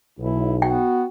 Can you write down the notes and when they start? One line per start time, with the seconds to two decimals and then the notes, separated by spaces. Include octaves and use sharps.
0.19 B1 E4
0.62 B3 F#4 G5